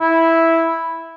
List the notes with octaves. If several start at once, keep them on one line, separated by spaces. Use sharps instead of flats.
E4